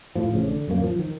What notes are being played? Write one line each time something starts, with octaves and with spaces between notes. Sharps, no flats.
A2 F3
A1 A2 C#3
D3
D1 F#2 G#3 A#3
F3
D#3